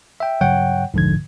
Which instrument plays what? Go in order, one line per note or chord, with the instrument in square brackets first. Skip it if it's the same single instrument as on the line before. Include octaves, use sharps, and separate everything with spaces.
[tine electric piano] E5 G5
[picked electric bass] G2 C#3 F#3 [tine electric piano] C#5 F#5 G5
[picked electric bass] D#1 B1 F3 [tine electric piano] G#2 D3 G#6